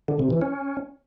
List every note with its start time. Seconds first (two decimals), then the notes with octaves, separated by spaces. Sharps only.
0.08 D3
0.19 C3
0.30 E3
0.41 C#4